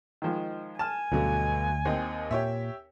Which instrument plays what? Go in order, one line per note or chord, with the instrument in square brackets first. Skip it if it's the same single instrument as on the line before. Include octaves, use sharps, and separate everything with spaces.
[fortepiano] D#3 F3 G#3
[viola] G#5 [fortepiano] A5 F6 [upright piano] E7
[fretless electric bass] D2 [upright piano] G2 B2 D3 [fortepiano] F#3
[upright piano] D#2 D#5 [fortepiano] C4
[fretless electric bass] A#2 [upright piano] G4 C#5 E5